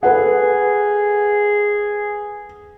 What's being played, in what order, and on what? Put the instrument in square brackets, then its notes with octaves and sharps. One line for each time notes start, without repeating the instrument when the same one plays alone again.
[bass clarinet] G#4 [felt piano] A4 B4 F#5